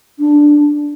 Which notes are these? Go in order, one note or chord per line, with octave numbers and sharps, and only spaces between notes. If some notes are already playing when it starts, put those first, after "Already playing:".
D4